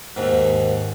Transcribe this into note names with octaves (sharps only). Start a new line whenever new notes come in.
D#2 G#2